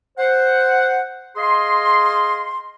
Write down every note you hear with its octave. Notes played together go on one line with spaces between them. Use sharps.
C5 F#5
G#4 D#5 F5 C6